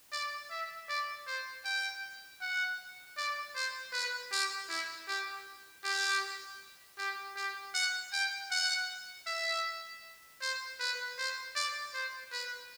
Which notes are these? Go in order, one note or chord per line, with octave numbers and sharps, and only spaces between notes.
D5
E5
D5
C5
G5
F#5
D5
C5
B4
G4
E4
G4
G4
G4
G4
F#5
G5
F#5
E5
C5
B4
C5
D5
C5
B4